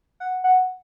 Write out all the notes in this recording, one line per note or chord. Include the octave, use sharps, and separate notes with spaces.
F#5
F#5